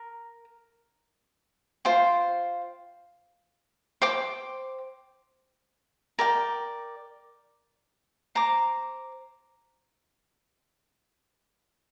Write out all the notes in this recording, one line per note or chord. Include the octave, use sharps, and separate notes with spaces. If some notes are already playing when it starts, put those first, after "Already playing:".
Already playing: A#4
F4 C5 G5
C5 G5 D6
A#4 D5 G5
C5 A#5 D6